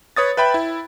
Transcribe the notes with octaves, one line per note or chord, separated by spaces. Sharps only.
B4 C#5 D#6 A6
B4 E5 G5 B5
E4